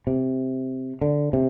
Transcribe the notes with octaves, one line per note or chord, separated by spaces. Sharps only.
C3
D3
C3